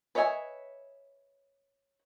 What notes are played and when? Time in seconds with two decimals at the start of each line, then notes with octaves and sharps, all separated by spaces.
0.15 B4 C#5 D#5 E5 G#5